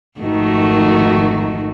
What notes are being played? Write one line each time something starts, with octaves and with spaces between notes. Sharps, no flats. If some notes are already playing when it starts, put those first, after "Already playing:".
G#1 F2 D#3 A3 F#4